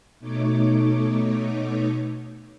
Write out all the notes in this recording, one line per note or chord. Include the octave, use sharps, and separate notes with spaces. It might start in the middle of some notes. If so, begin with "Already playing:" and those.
B2 A3 D#4 C#5 D6